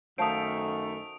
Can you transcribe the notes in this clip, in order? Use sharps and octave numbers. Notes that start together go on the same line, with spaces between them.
F#2 D#3 A3 C5 F5 A5 D#6 D7